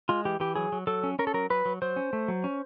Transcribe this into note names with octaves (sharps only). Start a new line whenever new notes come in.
G#3 F4
E3 G4
E3 G4
F#3 G#4
F#3
F#3 A4
C#4
C#4 A#4
A4
F#3 A#4
F#3 B4
F#3
F#3 C5
C#4
A3
F#3
C#4